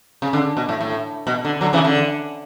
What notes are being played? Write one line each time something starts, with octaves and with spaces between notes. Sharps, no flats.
C#3
D3
B2
A2
A2
B2
D3
D3 F#3
C#3 E3
D3